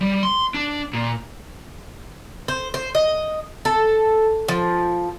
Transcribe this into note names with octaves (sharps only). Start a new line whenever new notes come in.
G3
C6
D4
A#2
C5
C5
D#5
A4
F3